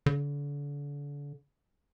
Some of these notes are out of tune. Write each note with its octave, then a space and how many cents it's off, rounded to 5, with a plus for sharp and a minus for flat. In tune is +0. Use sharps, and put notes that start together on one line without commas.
D3 -35